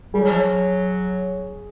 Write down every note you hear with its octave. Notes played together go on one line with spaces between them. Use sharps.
G3 G#4
F#3
F3
F#3